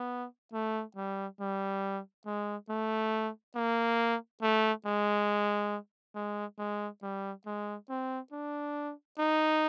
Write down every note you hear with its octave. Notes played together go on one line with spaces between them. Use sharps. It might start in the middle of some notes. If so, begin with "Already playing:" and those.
Already playing: B3
A3
G3
G3
G#3
A3
A#3
A3
G#3
G#3
G#3
G3
G#3
C4
D4
D#4